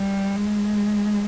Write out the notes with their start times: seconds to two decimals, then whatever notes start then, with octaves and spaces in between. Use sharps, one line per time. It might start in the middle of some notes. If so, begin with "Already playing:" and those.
Already playing: G3
0.36 G#3